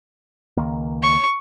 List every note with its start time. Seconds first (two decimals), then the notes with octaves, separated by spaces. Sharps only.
0.57 C#2 D#3 A#3
1.03 C#6